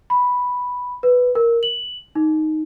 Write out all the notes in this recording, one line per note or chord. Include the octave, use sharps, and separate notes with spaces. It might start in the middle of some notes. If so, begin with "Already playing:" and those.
B5
B4
A#4
F#7
D#4